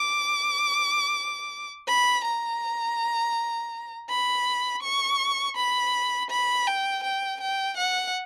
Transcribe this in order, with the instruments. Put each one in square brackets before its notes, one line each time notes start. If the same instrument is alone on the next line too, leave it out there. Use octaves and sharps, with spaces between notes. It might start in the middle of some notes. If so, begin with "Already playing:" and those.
Already playing: [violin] D6
B5
A#5
B5
C#6
B5
B5
G5
G5
G5
F#5